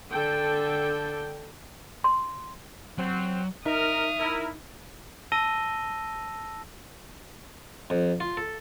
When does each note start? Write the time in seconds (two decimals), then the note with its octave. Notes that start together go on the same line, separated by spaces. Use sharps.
0.10 D3 A4 G5
2.04 C6
2.98 F#3 C4
3.66 D#4 A#4 E5 D#6 F6
4.19 E4 A#4
5.32 A5 E6 A#6 D#7 G7
7.90 F2
8.20 F4
8.37 A4